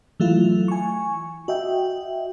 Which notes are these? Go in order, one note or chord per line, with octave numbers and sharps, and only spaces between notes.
E3 F#3 A3 E4 F4
G#5 C#6
F#4 D#5 E5 G5